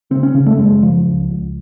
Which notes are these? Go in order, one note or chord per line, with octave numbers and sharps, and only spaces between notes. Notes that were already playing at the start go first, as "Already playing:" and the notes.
C#3 C4
C#4
C#3 C#4
A3
F#2 G#3
C#3 F3
C#2
C#2